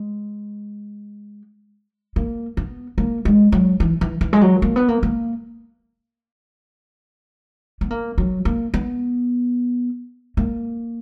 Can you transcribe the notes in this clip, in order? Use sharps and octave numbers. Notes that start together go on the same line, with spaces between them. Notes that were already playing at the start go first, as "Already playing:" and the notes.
Already playing: G#3
A#3
B3
A#3
G#3
F#3
E3
E3
E3
G#3
F#3
A#3
B3
A#3
A#3
B3
A#3
F#3
A#3
B3
A#3